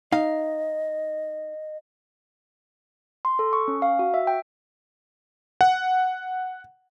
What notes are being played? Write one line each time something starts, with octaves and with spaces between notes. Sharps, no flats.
D#4 D#5 F5
C6
A4
C#6
C#4
F5
F#4
E5
G5
F#5